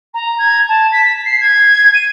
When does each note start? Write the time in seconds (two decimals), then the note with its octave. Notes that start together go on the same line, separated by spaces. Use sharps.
0.14 A#5
0.38 G#6
0.68 A5
0.91 B6
1.25 C7
1.40 G#6
1.94 D#7